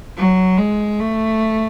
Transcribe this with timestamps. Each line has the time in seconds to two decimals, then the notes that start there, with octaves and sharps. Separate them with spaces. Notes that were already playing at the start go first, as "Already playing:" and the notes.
0.17 F#3
0.57 G#3
0.99 A3